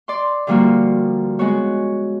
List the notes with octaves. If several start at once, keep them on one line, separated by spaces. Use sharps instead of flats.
D5 C6
D3 F3 G3 A#3 F4 F#4
G#3 B3 F#4 C#5